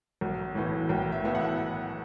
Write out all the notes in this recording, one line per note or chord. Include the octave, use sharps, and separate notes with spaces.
B1
A2 E3 B3
B1 G5
E5
A2 E3 B3 E5
F#5